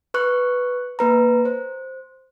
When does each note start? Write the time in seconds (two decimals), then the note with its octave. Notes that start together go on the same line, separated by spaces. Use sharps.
0.14 B4 C#6 F#6
0.99 A#3 B4 A#5
1.45 C5